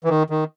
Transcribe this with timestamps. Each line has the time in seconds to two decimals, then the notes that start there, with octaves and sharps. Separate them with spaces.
0.04 E3
0.09 D#3
0.30 D#3